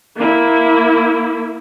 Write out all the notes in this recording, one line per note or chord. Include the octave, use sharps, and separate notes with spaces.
A#3 E4